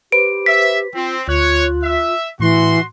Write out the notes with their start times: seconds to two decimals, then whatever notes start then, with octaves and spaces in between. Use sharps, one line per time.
0.12 G4 B4 C5 D7
0.46 E5 B6
0.94 C4 F4
1.28 D2 F4 C#5 F#6
1.82 E5
2.40 A2 E3 F#4 C6